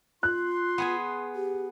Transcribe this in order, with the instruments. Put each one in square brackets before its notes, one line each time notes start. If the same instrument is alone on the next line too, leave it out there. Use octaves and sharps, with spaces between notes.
[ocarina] F4 [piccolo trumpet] C6 [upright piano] F#6
[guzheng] B3 G#4 G#5
[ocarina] G4